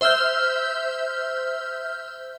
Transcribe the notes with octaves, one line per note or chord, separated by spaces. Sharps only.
C5 E5 E6 F6 G6